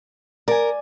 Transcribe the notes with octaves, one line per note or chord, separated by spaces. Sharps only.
A#4 D5 G#5